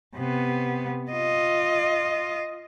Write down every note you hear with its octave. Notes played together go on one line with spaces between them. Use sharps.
C3 B3
F4 D#5